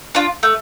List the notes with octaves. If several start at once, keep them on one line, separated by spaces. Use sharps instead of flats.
D4 F4
A3